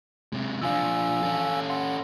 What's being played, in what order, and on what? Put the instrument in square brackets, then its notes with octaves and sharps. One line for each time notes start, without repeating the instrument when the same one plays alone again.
[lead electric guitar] C3 G#3
[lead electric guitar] F3 D4 [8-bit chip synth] F5 G#5 E6
[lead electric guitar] C#4 A4
[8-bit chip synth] F#5 C6